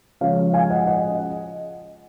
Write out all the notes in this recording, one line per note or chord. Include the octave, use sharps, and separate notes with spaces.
C#3 F3 G#3 C#5 F5
F5 G#5
D#5 F#5
D#5 F#5